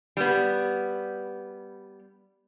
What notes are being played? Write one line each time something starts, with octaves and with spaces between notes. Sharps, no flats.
G3 B3